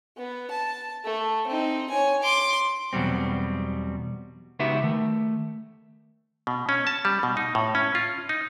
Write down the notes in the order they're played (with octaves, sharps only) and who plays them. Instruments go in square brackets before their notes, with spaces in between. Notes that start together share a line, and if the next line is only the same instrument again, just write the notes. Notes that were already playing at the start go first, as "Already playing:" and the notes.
[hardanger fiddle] B3
A5
A3
C4 D#4
C#5 G#5
C6 D6
[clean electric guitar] E2 B2 F#3 G3 C4
C#2 B3 D#4 F#4 G4 E5
D#3 A3
[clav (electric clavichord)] B2
C#4
A5
G3
B2
D#4
A2
C#4
F4
D#4